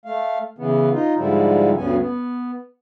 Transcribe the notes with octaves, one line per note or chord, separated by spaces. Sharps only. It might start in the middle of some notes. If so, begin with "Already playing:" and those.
A3 F5
C#3 E3 B3
D#4 F4
G#2 D3 F3 G3 E4
D2 G2 B3 C#4 G#5
B3